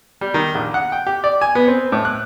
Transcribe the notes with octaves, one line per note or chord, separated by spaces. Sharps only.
G3
D#3
A#1
F#5
G5
G4
D5
G#5
B3
C4
A2
F#6